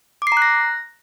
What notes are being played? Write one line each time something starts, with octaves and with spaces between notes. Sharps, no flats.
D6
C7
A#5
F#6
A#6